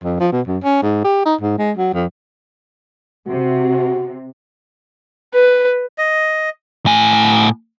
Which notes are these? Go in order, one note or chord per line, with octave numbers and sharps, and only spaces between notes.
F2
F3
B2
F#2
C#4
G#2
G4
D#4
G#2
G#3
F#3
F2
C3 F#4
B4
D#5
A2 G#5